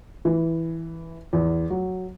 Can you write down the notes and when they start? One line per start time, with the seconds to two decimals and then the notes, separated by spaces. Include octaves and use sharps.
0.25 E3
1.33 E2
1.70 F#3